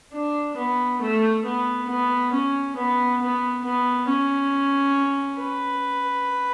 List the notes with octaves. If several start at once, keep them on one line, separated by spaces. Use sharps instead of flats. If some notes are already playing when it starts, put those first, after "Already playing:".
D4
B3
A3
B3
B3
C#4
B3
B3
B3
C#4
B4